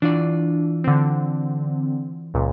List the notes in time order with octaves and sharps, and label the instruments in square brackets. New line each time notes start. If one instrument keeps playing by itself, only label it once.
[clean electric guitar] E3 F4 D5 [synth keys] D4
[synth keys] D3 C4
C#2 A#2